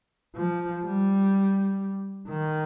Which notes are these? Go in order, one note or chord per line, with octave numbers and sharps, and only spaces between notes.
F3
G3
D#3